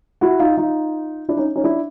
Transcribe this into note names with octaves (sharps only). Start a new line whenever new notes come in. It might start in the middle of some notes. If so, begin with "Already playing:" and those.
E4 F#4
D#4 F4
D#4 F4
D4 E4
C#4 D#4
C#4 D#4
D4 E4